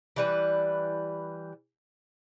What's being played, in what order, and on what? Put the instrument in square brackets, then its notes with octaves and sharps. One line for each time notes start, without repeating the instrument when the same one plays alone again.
[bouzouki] E3 G3 B4